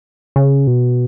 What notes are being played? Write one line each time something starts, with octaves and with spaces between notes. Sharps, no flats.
C#3
B2